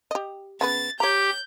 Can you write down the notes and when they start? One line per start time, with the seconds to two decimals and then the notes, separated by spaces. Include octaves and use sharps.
0.11 G4 D#5
0.61 C#3 B3 B4 A6
1.00 G4 C#5 A#5 G6